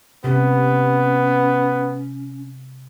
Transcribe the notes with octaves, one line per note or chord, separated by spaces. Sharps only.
C3 B3 C#4